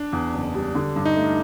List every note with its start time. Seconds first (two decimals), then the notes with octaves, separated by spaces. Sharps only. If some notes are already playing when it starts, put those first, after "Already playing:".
Already playing: D4
0.13 E2
0.33 F#1
0.54 G3
0.75 D3
0.96 G2
1.05 D#4
1.17 A3